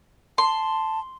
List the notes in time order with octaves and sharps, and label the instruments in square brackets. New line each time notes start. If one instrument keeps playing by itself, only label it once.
[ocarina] A5 [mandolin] C6